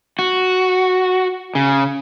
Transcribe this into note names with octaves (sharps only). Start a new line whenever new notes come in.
F#4
C#3